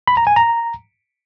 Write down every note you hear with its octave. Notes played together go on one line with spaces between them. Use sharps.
B5
A#5
G#5
A#5